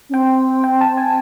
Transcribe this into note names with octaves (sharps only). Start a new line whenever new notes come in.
C#4
C4 G5
G5
A5
G#5